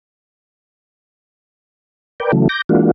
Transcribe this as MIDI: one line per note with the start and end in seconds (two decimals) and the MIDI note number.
2.20 2.32 70
2.20 2.32 71
2.20 2.32 74
2.20 2.32 79
2.32 2.48 49
2.32 2.48 52
2.32 2.48 54
2.32 2.48 57
2.49 2.62 86
2.49 2.62 91
2.49 2.62 94
2.69 2.91 52
2.69 2.91 56
2.69 2.91 58
2.69 2.91 62
2.69 2.91 65
2.69 2.91 66